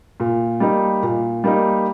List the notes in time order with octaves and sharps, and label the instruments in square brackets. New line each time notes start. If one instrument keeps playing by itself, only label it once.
[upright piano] A#2
G3 A#3 D#4
A#2
G3 A#3 D#4